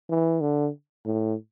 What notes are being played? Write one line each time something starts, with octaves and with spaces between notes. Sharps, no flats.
E3
D3
A2